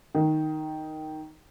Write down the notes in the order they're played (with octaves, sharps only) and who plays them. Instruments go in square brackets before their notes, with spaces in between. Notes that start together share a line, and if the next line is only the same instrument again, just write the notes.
[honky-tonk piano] D#3